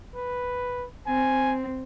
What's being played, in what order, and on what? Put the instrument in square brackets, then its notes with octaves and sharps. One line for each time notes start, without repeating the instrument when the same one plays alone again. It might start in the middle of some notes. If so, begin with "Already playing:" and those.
[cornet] B4
[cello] C4 [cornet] G#5